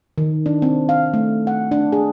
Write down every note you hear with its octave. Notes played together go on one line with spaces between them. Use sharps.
D#3
D4
C4
F5
A3
F#5
D4
G#4